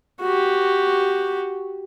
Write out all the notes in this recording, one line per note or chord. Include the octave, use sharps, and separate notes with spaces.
F#4 G4